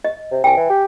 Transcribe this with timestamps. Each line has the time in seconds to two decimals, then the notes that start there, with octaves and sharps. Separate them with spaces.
0.05 D#5
0.31 C3
0.44 C2 G5 G#5
0.57 E3
0.70 G4